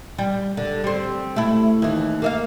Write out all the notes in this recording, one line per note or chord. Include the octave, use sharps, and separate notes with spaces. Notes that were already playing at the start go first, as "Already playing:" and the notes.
G3
D3
G3 C4
A3 E4
D#2 E3
A#3 E5 F5